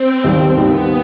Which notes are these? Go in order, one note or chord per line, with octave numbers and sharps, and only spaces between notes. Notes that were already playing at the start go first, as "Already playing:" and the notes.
Already playing: C4
D#2 D#3 G3
D#2 D#3 G3 B3